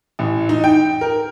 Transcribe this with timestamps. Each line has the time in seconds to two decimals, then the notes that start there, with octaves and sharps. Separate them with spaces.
0.19 A1
0.49 D#4
0.64 G5
1.01 A#4